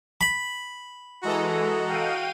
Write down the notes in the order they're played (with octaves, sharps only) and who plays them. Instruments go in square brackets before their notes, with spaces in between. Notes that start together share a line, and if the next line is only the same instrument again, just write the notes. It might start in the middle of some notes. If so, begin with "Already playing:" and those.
[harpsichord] B5
[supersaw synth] E3 G#3 [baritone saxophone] F#4 [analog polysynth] A4 D#5 A#5
[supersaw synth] F5 G5 D#7